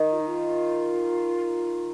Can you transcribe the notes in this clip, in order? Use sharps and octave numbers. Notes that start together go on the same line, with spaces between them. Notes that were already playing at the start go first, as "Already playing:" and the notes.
Already playing: D#3
F4
D#4
F4